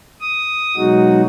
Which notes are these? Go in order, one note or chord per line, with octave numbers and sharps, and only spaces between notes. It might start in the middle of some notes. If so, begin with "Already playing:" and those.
D#6
B2 F#3 G#3 D#4 F#4